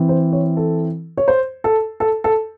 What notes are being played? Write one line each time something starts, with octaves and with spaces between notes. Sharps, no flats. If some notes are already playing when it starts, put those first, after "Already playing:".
Already playing: E3 C4
C5
C#5
A4
C#5
C5
A4
A4
A4